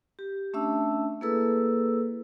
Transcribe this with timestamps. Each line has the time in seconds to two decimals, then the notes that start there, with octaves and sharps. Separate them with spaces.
0.19 G4
0.54 A3 C#4 D4 E5 A5 E6
1.21 A#3 E4 G#4 A4 B4 E6